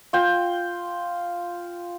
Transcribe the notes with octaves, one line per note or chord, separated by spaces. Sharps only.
F4 G5